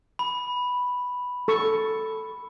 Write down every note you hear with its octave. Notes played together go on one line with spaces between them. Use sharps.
B5
A4 C#6